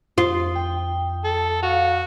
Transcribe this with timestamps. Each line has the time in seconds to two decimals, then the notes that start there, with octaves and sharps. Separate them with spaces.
0.18 F2 F4 C5 D#6
0.55 G5
1.24 A4
1.63 F#4 F5